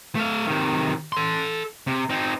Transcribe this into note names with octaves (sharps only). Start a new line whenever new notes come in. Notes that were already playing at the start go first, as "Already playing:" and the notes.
A3 F5
C3 D#3
A4 C6
C3
C4 D#4